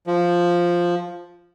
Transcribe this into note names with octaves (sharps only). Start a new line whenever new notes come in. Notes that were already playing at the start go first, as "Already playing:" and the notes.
F3